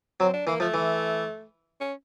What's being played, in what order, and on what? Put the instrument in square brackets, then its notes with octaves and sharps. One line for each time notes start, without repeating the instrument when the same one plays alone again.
[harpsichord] F#3 [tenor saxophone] C4
[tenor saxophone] D4
[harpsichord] E3 [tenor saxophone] A#3
[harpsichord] F3 [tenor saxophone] A3
[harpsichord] E3
[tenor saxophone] C#4